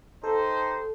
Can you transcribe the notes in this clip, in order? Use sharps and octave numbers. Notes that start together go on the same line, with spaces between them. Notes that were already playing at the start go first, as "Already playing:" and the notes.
D#4 G4 A4 C5